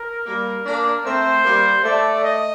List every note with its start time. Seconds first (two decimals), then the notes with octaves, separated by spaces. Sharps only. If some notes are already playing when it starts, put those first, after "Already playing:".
Already playing: A#4
0.26 G3 A#3
0.66 A#3 D4
1.05 A3 C4 C5
1.45 G3 A#3
1.84 A3 D5
2.24 D#5